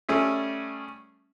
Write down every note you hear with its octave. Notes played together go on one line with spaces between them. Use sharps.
G3 A3 C#4 G#4 E5